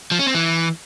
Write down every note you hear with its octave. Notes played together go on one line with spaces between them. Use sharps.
F3
C#4
C4
E3